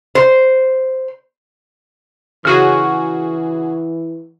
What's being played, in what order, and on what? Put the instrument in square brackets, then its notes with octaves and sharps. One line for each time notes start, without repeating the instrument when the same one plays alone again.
[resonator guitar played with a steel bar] C5
[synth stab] C#3 F#4 G#4 [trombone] E3 [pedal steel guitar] C#6 F6